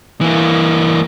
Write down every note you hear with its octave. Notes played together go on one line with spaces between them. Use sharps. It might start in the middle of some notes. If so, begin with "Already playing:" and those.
E3 A#3